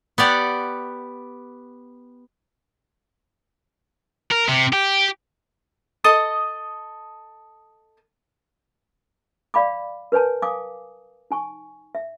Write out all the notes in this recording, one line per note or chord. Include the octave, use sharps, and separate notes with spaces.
B3 G4 D5 F#5
A#4
C3
G4
A4 D#5 D#6
D5 F5 B5 D6
A#4 B4 C#5 G#5 A5
F5 G#5 D6 D#6
D#4 G#5 C#6
E5